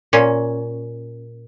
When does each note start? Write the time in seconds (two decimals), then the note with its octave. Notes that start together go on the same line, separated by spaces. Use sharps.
0.13 A#2 C#4